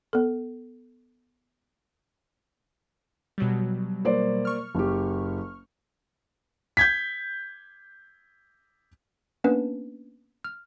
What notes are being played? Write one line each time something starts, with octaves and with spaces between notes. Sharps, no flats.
B3 A4
B2 F#3 G3
A#3 C5 D5
C#6 F6
F#1 G4
G6 G#6 B6
A#3 B3 C#4 D4 B4
F6